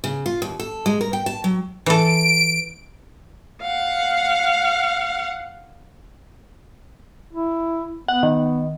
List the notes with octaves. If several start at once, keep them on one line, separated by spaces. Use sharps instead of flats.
C#3
F4
D#2
A4
G#3
A#4
G5
A5
F#3
E3 A4 D7
F5 F#5
E4
B3 F#5
D#3